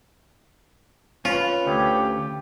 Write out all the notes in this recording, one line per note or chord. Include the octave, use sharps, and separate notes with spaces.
C#4 F4 B4
D2 G4